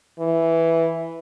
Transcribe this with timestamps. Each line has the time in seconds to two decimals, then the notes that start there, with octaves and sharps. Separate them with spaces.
0.20 E3